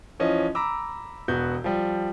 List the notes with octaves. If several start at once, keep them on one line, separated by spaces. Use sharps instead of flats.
E3 F3 C#4 D#5
A#5 B5 D6 E6
E1 B3 F#4 G6
F3 G3